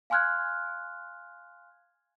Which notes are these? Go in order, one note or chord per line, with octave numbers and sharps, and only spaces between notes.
F5 G#5 C6 F6 F#6 G#6